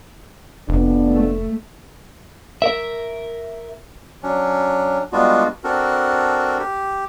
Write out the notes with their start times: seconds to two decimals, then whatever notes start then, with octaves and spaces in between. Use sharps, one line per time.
0.69 F1 F2 B3 D4
1.11 A3
2.62 A#4 E5
4.23 F#3 C#4 D4
5.12 G3 G#3 B3 D4 F4 F#4
5.64 C4 D4 F#4 A4 A#4
6.59 G4